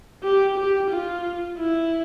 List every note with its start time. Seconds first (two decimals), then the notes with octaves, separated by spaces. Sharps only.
0.23 G4
0.58 G4
0.90 F4
1.58 E4